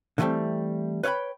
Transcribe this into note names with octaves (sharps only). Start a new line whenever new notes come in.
D3 E3 F3 G3 A3 C4
B4 C#5 F5 G5 B5